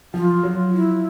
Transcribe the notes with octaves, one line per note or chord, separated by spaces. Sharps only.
F3 F4
F#3
E4